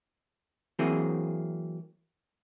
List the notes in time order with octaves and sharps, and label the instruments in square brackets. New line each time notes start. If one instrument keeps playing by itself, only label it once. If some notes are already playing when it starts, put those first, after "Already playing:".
[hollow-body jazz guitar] E3 F#3 A#3 C4 G#4